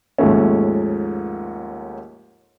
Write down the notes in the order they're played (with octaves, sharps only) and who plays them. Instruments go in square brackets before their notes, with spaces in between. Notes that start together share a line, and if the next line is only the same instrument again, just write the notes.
[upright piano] D#2 G#2 F3 A3 C#4